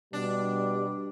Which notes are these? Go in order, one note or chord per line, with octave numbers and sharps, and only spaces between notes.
B2 G3 D4